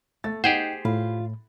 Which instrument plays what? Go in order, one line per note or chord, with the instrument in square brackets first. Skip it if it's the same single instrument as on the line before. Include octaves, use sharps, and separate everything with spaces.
[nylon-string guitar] A3 [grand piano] A6
[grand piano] D#4 F#5 [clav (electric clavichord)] G4 G#4 C5 [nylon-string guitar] G5
[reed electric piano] A2 [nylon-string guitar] F4 [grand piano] B5